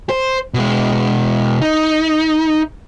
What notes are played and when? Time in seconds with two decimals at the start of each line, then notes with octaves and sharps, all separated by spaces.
0.09 C5
0.54 B2 G#3
1.62 D#4